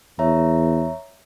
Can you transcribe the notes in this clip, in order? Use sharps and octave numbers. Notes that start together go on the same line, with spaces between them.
E2 C#5 E5 A#5